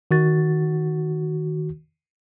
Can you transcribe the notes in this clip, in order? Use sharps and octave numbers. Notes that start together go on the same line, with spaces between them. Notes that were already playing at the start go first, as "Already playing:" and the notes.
D#3 F#4 A6